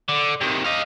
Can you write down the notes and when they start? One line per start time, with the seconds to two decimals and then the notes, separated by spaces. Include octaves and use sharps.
0.09 D3
0.41 C3 D#3
0.64 D#5 F5